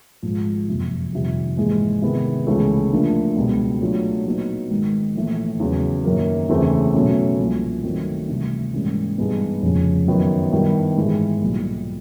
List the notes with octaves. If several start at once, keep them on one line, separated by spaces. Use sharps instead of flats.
G#1 G#2 F3
F#1 F2 C3
F2 C3 D#3 G3
A#1 G#2 E3 G#3
C3 D#3 G#3 B3 E4
C#2 C#3 E3 A3
D2 D3 F3 A#3
C#2 B2 G3 B3
A2 F#3 A3 D4 F4
A#2 F#3 B3 D#4
G#1 G#2 D#3
A#1 A2 E3 A3
E2 C#3 F#3
F#2 D#3 F#3 A#3
E2 C#3 E3 A3 C4
B2 F#3 A3 C#4 E4
C2 A#2 F3
G2 D#3 F#3 A3 C4
D2 C3 E3 G3
G#2 E3 G3 A#3 C#4
G2 E3 G#3 B3 D#4
F1 F2 C#3
F#2 D#3 F#3 B3
G2 D#3 G3 B3 E4
G#2 E3 G#3
B1 A#2 G3